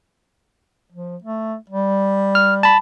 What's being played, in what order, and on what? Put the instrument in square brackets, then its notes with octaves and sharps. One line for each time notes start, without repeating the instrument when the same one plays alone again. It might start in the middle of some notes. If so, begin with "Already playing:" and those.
[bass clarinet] F3
A3
G3
[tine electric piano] F6
A5 B5